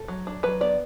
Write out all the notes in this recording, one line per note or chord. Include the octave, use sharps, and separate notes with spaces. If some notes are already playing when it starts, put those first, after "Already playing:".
Already playing: A4
F#3
D4
F#3 B4
B3 D5